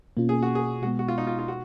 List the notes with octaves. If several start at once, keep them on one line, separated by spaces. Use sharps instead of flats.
B2 A#3 C#4 F4
G#4
F#4
G#4
B2 G#3 B3 F#4
F#4
F4
D#4
F4
F4
F#4